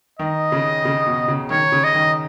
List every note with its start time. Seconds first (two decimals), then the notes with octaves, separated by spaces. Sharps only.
0.19 D#3 D#5
0.52 C#3
0.85 C#3
1.07 B2
1.28 C#3
1.50 D#3 C#5
1.72 C#3
1.84 D#5
1.95 D#3